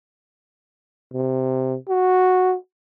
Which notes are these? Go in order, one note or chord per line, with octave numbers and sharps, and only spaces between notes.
C3
F#4